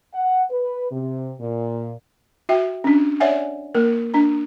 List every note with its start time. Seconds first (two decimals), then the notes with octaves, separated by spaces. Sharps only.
0.14 F#5
0.50 B4
0.91 C3
1.39 A#2
2.49 F#4 E5 G5
2.84 C#4 D4
3.20 C#5 D5 E5 F#5 G#5
3.75 A#3 A#4
4.14 D4 A#5